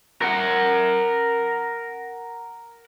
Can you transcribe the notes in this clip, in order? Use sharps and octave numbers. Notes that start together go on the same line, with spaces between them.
A#4 F#5